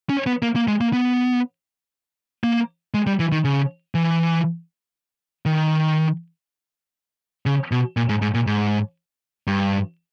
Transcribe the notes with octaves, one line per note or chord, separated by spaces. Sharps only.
C#4
B3
A#3
A#3
G#3
A#3
B3
A#3
G#3
G3
E3
D#3
C#3
E3
D#3
C#3
B2
A#2
G#2
G#2
A#2
G#2
G2